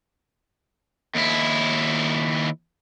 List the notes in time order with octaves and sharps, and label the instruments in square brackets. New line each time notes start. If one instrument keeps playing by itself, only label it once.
[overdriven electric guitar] D#2 E4